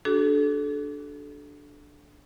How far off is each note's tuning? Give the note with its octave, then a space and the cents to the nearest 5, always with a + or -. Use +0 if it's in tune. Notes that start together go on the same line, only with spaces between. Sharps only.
D4 +0 F#4 +35 A4 -25